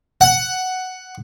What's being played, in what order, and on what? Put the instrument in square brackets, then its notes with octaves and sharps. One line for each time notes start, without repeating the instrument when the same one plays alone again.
[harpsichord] F#5